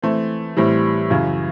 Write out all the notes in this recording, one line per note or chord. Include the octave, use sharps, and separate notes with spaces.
E3 A3 C4
A2 E3 G3 C4
F#2 C#3 E3